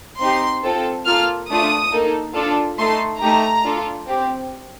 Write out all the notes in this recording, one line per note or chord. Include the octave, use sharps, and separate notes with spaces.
C4 D#4 G4 C6
C4 F4 A4
A#3 F4 A4 F6
A3 D4 F4 D#6
A#3 D#4 A4
D4 F4 A4
A3 D#4 A4 C6
A3 D#4 G4 A#5
D4 F4 A4
C4 G4